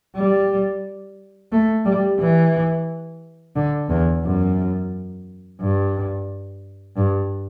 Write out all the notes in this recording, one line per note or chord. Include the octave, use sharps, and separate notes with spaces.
G3
A3
G3
E3
D3
E2
F#2
G2
G2